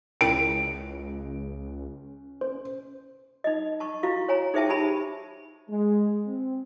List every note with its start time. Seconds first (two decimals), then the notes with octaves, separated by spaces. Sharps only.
0.21 C#2 C#4 E4 A#4 G5 D7
2.41 C5
3.44 D#4 D#5
3.80 A5 C#6
4.03 E4 F#4 F5 C#6
4.29 C#5 G#5 A#5
4.54 D#4 G#4 C5 E5 G5 A5
4.69 D#4 G4 G#5 A5 B5
5.69 G#3
6.26 C4